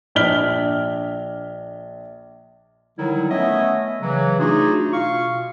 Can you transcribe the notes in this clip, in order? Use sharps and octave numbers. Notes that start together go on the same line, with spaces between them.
A#1 D4 D#5 F6 B6 G7
D3 D#3 F#3 G3 D#4 E4
A3 B3 C#4 C#5 D#5 E5
C#3 E3 F#3
A3 D4 D#4 F4 F#4 G#4
B2 F4 F5 C#6